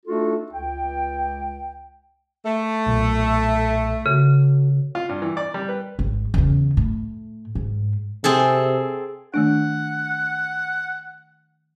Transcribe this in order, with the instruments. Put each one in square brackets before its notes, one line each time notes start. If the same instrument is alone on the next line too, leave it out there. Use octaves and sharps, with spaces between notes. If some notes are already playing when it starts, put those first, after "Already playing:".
[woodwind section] A3 D4 D#4 F4 F#4 A4
C#2 G5
[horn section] A3
[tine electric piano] B1 A#2
[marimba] C#3 [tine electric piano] F#4 A4
[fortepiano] F4
G2
E3
D5
G3
B4
[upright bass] G#1
E2 C#3
A2
G#2
[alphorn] C3 [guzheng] C4 G#4 A4
[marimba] D#3 A3 D4 [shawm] F#5